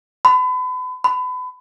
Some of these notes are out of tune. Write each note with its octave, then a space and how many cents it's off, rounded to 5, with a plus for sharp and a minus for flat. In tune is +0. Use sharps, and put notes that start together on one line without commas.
B5 +35
B5 +30